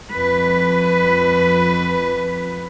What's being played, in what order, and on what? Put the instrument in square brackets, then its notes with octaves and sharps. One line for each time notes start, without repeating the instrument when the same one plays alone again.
[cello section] F2 B4